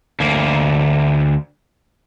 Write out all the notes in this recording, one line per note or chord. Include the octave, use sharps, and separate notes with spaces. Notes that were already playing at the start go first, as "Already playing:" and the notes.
D2 A#3